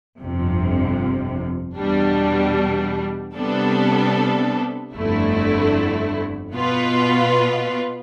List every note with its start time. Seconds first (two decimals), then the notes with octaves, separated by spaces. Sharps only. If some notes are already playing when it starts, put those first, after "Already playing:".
0.19 G1 F2 C3
1.77 E2 B2 G3 D4
3.35 C3 G3 B3 D4 A4
4.93 G1 F2 D3 A3 E4
6.52 B2 B3 F4 B4